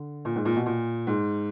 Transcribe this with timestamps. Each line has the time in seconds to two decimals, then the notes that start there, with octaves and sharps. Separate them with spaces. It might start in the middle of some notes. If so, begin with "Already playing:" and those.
Already playing: D3
0.25 A#2
0.36 G#2
0.45 A#2
0.56 B2
0.66 A#2
1.07 G#2